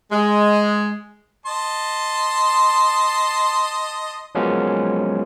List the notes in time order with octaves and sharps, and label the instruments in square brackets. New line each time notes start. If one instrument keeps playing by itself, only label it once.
[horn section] G#3
[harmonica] D#5 A5 C6
[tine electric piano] F3 F#3 G#3 A#3 B3 C#4